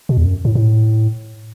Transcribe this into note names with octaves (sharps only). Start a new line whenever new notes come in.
B2
E2
F#2
A2
A2